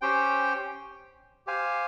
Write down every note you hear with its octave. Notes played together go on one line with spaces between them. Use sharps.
C#4 G4 C5 G5
G4 C5 F5 G#5